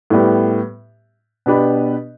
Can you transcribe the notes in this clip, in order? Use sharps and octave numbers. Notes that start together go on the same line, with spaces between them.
A2 G3 B3 G4
B2 B3 D4 G4 B4